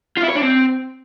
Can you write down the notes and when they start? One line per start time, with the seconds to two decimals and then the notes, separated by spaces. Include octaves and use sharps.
0.17 F4
0.23 E4
0.29 C#5
0.35 D4
0.42 C4